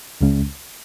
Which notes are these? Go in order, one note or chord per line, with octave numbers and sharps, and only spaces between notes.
C#2 C#3 G#3 C#4